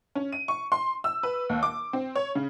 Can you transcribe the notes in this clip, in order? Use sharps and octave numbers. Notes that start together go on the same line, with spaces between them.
C#4
D#7
C#6
C6
E6
B4
D#2
D6
C4
C#5
C#3